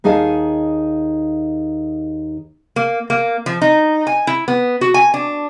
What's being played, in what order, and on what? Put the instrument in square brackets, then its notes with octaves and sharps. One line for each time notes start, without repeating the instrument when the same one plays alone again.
[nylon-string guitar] D#2 D#4 G#4 D#5 F5 A5
[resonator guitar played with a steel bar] A#3
A#3
F3
D#4
G#5
E4
B3
F#4
G#5
D4